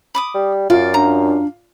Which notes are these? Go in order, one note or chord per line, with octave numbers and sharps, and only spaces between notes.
B5 D6 D#6
G3
F#2 F4 D5
D4 A#5